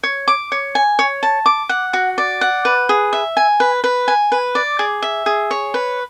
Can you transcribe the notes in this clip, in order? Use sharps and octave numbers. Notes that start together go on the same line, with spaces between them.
C#5
D6
C#5
G#5
C#5
A5
D6
F#5
F#4
D5
F#5
B4
G#4
E5
G#5
B4
B4
G#5
B4
D5
G#4
E5
G#4
C#5
B4